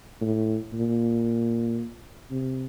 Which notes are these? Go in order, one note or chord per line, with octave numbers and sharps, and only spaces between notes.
A2
A#2
C3